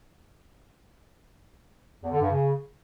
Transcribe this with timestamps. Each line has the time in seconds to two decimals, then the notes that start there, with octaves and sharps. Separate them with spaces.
2.03 E2
2.12 D3
2.21 G2
2.30 C#3